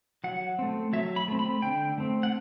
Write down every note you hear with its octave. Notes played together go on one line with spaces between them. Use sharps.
F#3 F#5
A3 C4
F#3 E5
B5
A3 C4
B5
D3 G5
A3 C4
F#5